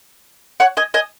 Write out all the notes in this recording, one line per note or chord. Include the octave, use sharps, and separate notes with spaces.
C#5 F#5
D#5 G#5
D#5 G#5